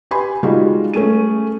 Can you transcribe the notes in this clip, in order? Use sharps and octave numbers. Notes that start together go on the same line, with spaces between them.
G4 B4 G#5 B5 C6
G3 G#3 D#4 F4 F#4
A3 C#4 G#4 D#7